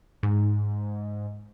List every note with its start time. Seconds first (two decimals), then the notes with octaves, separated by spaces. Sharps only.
0.23 G#2